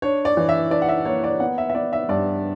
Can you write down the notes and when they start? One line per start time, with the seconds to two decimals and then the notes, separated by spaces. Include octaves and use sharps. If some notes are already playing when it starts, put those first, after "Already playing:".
0.02 D4 C#5
0.25 D5
0.37 E3
0.49 E5
0.71 D4 D5
0.82 F#5
0.89 E5
1.05 A#3 C#5
1.24 D5
1.40 B3 F#5
1.58 E5
1.70 E5
1.75 B3 D5
1.93 E5
2.09 G2 D5